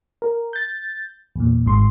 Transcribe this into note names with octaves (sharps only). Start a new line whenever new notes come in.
A#4
G6 A6
E2 A#2
G#1 G#2 C6